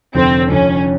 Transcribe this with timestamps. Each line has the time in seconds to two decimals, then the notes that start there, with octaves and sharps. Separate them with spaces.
0.14 F1 F2 D3 C4
0.50 F1 F2 D3 C#4